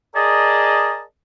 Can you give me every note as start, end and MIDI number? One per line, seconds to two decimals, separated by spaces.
0.15 1.02 68
0.15 1.02 70
0.15 1.02 74
0.15 1.02 75
0.15 1.02 81